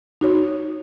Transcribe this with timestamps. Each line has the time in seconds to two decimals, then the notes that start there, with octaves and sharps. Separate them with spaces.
0.21 D#4 F#4 C#5